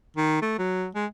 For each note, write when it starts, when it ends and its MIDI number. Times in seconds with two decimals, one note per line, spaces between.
0.16 0.41 51
0.42 0.54 57
0.58 0.87 54
0.95 1.06 56